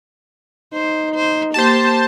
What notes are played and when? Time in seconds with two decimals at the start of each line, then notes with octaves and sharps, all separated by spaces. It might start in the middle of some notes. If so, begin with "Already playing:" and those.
0.73 D#4 C5
1.15 C5
1.54 A#3 G4 C5 A5